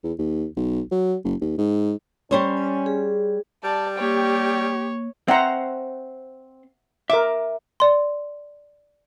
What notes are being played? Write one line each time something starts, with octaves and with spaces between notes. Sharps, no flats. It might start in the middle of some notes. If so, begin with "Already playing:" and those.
E2
D#2
B1
F#3
F#1
D#2
G#2
G3 C#4 C5 C#5
G#4
G3 D5 A5
A#3 G4 C#5 G5
C4 C5 E5 F#5 A#5
A#4 E5 D6
D5 C6